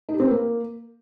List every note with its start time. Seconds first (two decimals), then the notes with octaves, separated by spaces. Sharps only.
0.09 D#4
0.14 G4
0.20 C4
0.25 B4
0.31 A#3